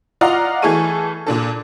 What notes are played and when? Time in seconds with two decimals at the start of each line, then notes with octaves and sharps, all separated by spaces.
0.21 F4 D5 D#5 F#5 A#5 F6
0.62 E3 A3 G#4 A4 C#6 D#7
1.27 A#2 D4 A4